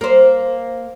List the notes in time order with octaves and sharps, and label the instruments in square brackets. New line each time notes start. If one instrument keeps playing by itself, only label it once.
[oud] A#3 C5